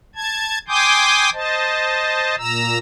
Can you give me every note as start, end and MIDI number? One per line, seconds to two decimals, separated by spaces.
0.15 0.58 81
0.15 0.58 92
0.68 1.30 79
0.68 1.30 80
0.68 1.30 84
0.68 1.30 86
0.68 1.30 87
0.68 1.30 91
1.34 2.36 72
1.34 2.36 75
1.34 2.36 81
2.38 2.78 46
2.38 2.78 82
2.38 2.78 88